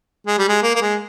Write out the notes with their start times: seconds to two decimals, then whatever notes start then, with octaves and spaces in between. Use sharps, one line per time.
0.27 G#3
0.38 G3
0.48 G#3
0.63 A#3
0.75 A#3
0.81 G#3